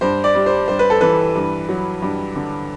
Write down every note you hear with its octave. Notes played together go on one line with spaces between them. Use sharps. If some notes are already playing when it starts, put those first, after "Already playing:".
G2 C5
D5
G3
C5
G2 C5
B4
A4
E3 B4
G2
F#3
G2
D3